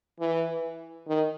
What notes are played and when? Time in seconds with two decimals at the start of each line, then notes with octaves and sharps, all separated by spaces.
0.20 E3
1.08 D#3